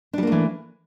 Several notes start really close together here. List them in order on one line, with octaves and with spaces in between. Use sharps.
D4 G3 A#3 A3 E3